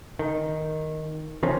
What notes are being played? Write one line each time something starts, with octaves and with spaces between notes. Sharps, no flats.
D#3
D#3 F3 C4 C#4